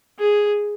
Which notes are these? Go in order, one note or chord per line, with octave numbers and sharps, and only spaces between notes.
G#4